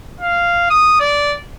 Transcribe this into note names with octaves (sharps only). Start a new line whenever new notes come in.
F5
D#6
D5